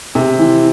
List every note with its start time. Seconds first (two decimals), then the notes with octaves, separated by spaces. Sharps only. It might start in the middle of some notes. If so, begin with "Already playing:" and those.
0.15 C3
0.39 E3